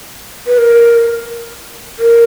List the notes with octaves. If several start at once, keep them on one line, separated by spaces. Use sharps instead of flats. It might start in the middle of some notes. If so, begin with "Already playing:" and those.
B4
A#4
A#4